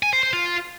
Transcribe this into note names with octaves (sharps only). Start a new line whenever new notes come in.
G#5
C5
C5
F4